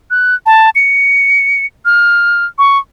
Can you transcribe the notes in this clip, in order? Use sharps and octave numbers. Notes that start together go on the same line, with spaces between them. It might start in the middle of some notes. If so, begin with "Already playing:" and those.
F#6
A5
C#7
F6
C#6